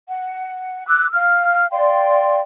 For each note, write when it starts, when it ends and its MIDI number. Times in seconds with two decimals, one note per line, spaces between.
0.07 0.85 78
0.87 1.07 86
0.87 1.07 88
0.87 1.07 90
1.12 1.65 77
1.12 1.65 89
1.71 2.40 74
1.71 2.40 77
1.71 2.40 79
1.71 2.40 84